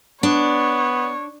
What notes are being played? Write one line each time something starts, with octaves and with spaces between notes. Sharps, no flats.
B3 D4 C#5